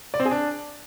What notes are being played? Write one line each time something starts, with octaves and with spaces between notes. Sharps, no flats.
D5
C4
G#4
D4